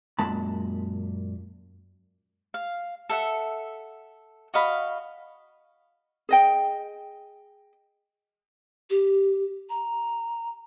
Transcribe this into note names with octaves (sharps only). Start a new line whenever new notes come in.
F#2 A#2 G#3 A5 B5
F5
A4 E5 F#5
F#4 D#5 F5 B5
G#4 D#5 G5
G4
A#5